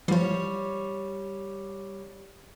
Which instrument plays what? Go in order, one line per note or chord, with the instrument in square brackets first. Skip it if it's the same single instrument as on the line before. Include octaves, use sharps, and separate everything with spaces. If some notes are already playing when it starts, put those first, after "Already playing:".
[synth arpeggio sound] E3 F3 [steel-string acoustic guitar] G3 C#5